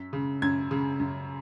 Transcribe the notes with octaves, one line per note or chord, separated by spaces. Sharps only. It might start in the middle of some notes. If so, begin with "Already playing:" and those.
Already playing: F#2 B6
C#3
F#2 G#6
C#3
F#2